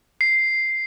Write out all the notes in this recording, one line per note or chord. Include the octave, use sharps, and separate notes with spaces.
C7